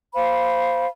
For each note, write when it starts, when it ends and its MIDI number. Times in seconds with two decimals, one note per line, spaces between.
0.15 0.86 72
0.15 0.86 77
0.15 0.86 83